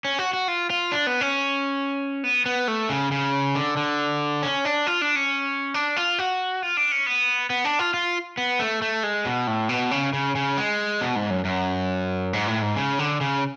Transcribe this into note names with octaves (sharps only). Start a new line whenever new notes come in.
C#4
F#4
F#4
F4
F4
D4
B3
C#4
B3
B3
A3
C#3
C#3
D3
D3
C#4
D4
F4
D4
C#4
D4
F4
F#4
F4
D4
C#4
B3
B3
D4
F4
F4
B3
A3
A3
G#3
B2
A2
B2
C#3
C#3
C#3
G#3
B2
G#2
F#2
F#2
G#2
A2
G#2
C#3
D3
C#3